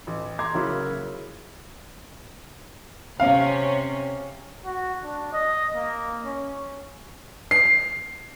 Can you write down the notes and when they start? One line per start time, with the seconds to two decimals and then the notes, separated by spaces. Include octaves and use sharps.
0.07 A1
0.39 A#5 C6 D6 G#6
0.54 C#3 F#3 A#3 E4 F#4
3.20 C3 C#4 F5
4.65 F#4
5.04 D4
5.33 D#5
5.75 A#3
6.25 C#4
7.51 C7